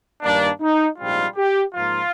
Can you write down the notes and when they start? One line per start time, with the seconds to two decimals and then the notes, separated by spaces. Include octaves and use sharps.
0.22 G2 D#3 A#3 D4
0.60 D#4
0.98 A#1 G#2 G3 C4 F4
1.36 G4
1.74 G#2 F3 A#3 F4